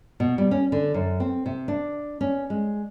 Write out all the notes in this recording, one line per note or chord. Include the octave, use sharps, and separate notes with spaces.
B2
G3
C#4
D3
F#2
C4
C3
D4
C#4
G#3